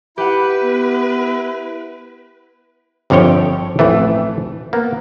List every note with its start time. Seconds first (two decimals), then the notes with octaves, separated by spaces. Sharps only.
0.18 E4 G4 B4 F#5 B5
0.62 B3
3.10 G1 F2 D3 F3 C#5 G5
3.79 A1 F2 E3 A3
4.73 A#3 B3